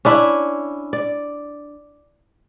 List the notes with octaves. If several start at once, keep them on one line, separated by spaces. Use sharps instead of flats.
C#4 D4 E4
D5